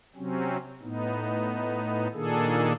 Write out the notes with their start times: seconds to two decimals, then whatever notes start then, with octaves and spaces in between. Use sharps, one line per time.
0.16 C3 F#3 C4 C#4
0.82 A2 B3 D#4
2.14 A#2 D#3 A#3 D4 G#4 A4